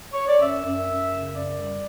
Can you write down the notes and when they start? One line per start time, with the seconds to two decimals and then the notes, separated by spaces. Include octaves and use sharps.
0.13 C#5
0.27 D5
0.40 F#2 E5
0.64 F#2
0.87 F#2
1.11 C#3
1.34 F#2 D5
1.59 G3